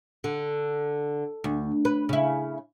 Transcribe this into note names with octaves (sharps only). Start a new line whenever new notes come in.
D3
D2
B4
C#3 E4